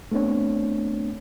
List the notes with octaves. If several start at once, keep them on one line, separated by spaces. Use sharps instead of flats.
A3 B3 C4 D4 C#5